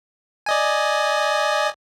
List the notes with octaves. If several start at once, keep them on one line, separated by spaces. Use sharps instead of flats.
D5 D#5 G#5